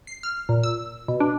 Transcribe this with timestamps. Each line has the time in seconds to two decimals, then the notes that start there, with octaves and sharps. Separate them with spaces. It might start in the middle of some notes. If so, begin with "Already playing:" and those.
0.07 C7
0.23 F6
0.49 A#2
0.63 E6
1.08 B2
1.20 D4